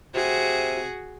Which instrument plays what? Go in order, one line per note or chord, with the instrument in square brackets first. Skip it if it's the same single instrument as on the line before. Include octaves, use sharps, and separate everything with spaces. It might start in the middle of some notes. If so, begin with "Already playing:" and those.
[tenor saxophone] C3 [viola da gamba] F#4 G#4